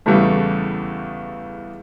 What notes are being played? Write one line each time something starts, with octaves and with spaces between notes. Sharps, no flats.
E2 C#3 E3 G3 A3